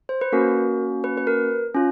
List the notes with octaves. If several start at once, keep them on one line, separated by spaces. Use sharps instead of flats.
C5
B4
A#3 C#4 F#4 A#4
B4
B4
A#4
C#4 F4